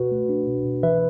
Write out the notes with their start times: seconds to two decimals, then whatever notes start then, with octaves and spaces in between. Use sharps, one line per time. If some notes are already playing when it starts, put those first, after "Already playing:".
Already playing: B2 F#4 B4
0.11 A3
0.29 D4
0.48 B2
0.65 B2
0.83 E3 B4 E5